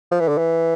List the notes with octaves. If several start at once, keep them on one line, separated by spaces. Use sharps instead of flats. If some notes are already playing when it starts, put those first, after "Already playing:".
F3
E3
D3
E3